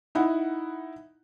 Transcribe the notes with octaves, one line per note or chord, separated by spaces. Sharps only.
D#4 E4 F#5